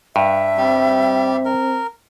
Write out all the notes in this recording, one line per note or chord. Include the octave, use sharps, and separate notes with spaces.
G2 E5
G3 C4 G4
A#4